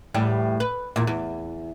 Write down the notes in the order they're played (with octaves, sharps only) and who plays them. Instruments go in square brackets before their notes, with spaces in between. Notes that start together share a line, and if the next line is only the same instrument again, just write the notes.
[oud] E2 A2 G3
B4
E2 A#2
E2